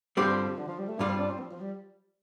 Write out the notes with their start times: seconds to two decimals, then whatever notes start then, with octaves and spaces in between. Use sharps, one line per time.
0.17 G2 D3 F3 G3 C4 G4
0.58 D3
0.68 F3
0.79 G3
0.88 A3
0.99 G2 G3 D4 F4
1.09 C4
1.19 D4
1.30 C4
1.40 F3
1.51 F3
1.60 G3